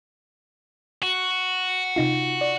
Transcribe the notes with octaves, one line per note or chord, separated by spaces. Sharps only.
F#4
C3 D#4 F4
D5